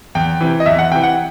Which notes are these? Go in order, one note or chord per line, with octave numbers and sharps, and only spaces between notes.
E2 G5
C3 E3
D#5
E2 E5
F#5
C3 E3 G5
F#5